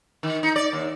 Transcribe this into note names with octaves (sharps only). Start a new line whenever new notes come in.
D#3
D#4
D5
D#2